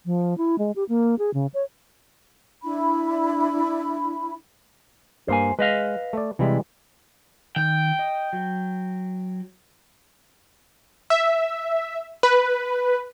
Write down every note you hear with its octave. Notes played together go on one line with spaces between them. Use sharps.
F3
E4
G#3
G4
A#3
G#4
C#3
C#5
D4 E4 B5
G2 A#3 C5 G#5
G#3 B4 D#5 F5
A3 D5
C3 E3 G3 G#3 E4
D#3 G5
D#5
F#3
E5
B4